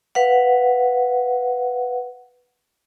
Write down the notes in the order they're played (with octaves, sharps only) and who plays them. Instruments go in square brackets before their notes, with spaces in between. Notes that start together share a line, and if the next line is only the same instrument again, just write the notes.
[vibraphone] B4 F5 F#5